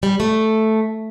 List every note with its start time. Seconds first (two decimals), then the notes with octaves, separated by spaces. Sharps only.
0.03 G3
0.20 A3